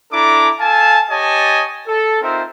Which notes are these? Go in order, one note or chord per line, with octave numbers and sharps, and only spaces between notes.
D4 E4 A4 A#5 D6
A4 F5 G#5 A5
G4 C#5 D#5 G#5 A5
A4
C4 D#4 F4 A#4 C5 E5